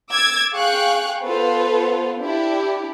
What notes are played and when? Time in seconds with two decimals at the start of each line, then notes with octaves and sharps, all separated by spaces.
0.12 D6 E6 G#6 A6
0.54 G#4 F5 G5 C#6 F#6
1.23 B3 F4 A4 B4 C5
2.19 D4 E4 G4